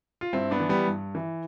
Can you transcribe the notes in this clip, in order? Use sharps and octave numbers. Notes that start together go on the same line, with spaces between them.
F4
G2 C4 E4
B3 D4
E3
G3 B3
G2
E3